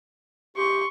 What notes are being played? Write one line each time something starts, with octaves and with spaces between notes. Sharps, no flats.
G4 C6 C#6